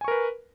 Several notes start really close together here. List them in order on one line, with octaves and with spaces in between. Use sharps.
G#5 C#6 A#4 B4